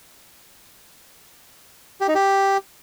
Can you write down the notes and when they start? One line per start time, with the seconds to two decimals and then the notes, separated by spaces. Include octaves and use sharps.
2.01 G4
2.08 D#4
2.15 G4